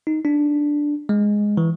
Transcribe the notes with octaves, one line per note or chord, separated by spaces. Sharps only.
D#4
D4
G#3
E3